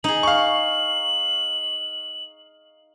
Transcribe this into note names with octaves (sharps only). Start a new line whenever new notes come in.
D#4 G#4 F#7
F5 C#6